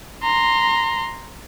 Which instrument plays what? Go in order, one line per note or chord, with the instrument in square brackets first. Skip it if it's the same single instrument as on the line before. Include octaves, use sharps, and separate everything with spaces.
[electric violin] A#5 C6